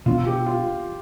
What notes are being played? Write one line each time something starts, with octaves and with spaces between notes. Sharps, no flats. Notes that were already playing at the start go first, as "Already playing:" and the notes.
B2 B3 D4 F4
G4
F4